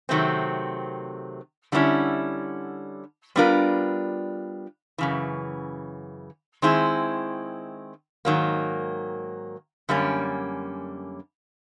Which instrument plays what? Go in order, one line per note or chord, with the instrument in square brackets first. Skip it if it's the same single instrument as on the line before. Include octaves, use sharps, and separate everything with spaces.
[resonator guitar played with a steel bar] C3 D#3 F#3 A3 C4
D3 G3 A#3 C#4 E4
G3 B3 D4 F4 A#4
F#2 C#3 E3
D#3 G#3 C4 E4 G#4
G#2 D#3 F#3 A#3
F#2 D3 G3 A#3 C#4